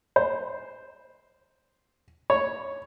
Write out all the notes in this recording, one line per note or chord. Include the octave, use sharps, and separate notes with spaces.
C5
C#5